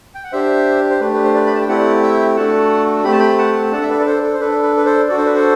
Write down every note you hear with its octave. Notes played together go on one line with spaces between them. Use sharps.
G5
F#5
D4 G4 C5 E5
C5
A3 D4 G4 B4
B4
C5
B4 D5
B5
A5
G5
A3 C4 E4 G4 D5 F#5
E5 G5
A3 D4 F#4 A4 F#5 A5
A3 C4 G4 B5
A5
G5 B5
F#5 A5
D4 A4 F#5 A5
E5
B4 D5
B4
A4 C5
A4
C5
D4 A4 B4
B4
B4
A4 C5
D4 F#4 A4 D5
C5
B4
A4 C5